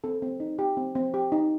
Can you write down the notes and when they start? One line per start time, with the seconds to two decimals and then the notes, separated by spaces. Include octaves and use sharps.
0.04 C4 A4
0.22 C4
0.40 D#4
0.59 G4
0.77 C4
0.95 C4
1.14 G4
1.32 D#4